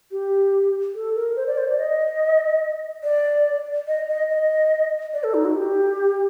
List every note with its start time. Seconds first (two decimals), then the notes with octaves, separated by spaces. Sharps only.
0.11 G4
0.95 A4
1.15 A#4
1.36 C5
1.47 D5
1.58 C5
1.68 D5
1.79 D#5
3.04 D5
3.88 D#5
4.08 D#5
4.29 D#5
5.13 D5
5.24 A4
5.34 D#4
5.45 F#4
5.55 G4